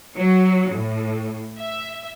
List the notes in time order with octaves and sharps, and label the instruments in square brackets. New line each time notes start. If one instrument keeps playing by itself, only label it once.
[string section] F#3
A2
E5